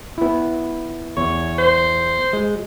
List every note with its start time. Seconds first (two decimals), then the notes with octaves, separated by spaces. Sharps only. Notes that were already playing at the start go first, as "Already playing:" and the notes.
0.18 B3 E4
1.17 E2 C#5
1.59 C5
2.33 G#3